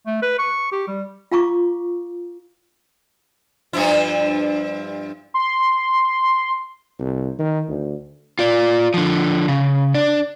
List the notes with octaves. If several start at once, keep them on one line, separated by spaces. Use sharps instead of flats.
A3
B4
C#6
G4
G3
F4 F5 A#5 C#6 D6
G2 F3 E4
C6
C2
D#3
D2
F4 D5
D3 F3
C#3
D4